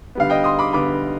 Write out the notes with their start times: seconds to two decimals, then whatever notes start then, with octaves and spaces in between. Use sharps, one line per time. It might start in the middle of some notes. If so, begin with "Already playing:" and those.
0.15 D3 G3 B3 F5
0.30 D#5 G5
0.44 C6 D#6
0.59 B5 D6
0.73 D3 G3 B3 B5 D6